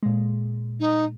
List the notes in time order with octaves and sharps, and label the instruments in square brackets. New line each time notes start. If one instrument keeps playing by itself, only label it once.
[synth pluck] A#2 G#3
[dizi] D#4